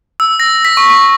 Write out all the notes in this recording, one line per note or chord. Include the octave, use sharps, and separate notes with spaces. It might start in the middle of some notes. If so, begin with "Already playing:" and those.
E6
A#6
B6
C#6
C#6